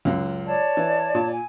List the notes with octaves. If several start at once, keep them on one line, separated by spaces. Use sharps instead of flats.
C#2 F#2
C#5 D5 A5
E3
A#2
G#5